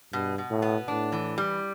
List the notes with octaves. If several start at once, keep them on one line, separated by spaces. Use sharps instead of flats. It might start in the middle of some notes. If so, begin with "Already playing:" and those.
G2 B2
B2
A2
B3
A2 D4
E3
G3